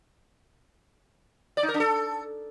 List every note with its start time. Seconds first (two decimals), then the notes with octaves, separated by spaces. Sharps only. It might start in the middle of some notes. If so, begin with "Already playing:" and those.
1.57 D5
1.63 D#4
1.69 A#4
1.74 D4
1.80 A4